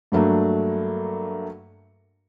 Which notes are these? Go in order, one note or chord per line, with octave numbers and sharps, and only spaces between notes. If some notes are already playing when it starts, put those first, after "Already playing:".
G2 F#3 A3 A#3 D4